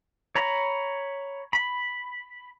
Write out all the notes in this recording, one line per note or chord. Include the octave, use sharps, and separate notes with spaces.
C#5 A#5 B5
B5